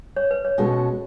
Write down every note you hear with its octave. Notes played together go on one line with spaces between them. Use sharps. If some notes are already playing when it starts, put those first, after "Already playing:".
C#5
B4
C#5
B2 G#3 C#4 F#4 A4